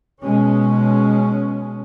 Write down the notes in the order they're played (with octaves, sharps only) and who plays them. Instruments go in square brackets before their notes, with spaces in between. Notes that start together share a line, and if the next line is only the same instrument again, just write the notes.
[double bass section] B2 G#3 C#4